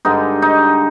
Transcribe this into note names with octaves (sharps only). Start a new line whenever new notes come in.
G2 D3 G#3 D#4
D#4